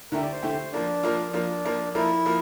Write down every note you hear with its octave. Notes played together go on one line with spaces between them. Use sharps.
D3 A3 E4 G4 A#4
D5
C5
D3 A3 E4 G4
F3 A#3 D4 F4
F3 A#3 F4
F3 A#3 D4 F4
F3 A#3 F4
F3 A#3 E4 F4 A#4
F3 A#3 F4